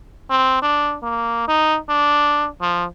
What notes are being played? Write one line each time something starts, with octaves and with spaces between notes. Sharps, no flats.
C4
D4
A#3
D#4
D4
F3